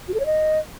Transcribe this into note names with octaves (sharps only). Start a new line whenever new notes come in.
F#4
A4
C#5
D#5